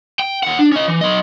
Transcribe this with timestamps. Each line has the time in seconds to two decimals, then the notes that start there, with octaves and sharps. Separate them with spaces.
0.20 G5
0.43 D#2 F#5
0.59 D4
0.72 C#4 D#5
0.88 E3
1.01 F#3 D#5